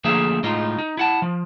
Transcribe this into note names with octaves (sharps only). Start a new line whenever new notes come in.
D3 F3 A3 A#3 G#4 E5
A2 G#3 D#4 F4
D#4
E4 F#5 A5
F3